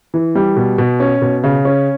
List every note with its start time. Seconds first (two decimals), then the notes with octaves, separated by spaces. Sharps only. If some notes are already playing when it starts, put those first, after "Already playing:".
0.14 E3
0.35 G3
0.56 B2
0.78 B2
1.00 C#4
1.22 B2
1.44 C#3
1.65 C#4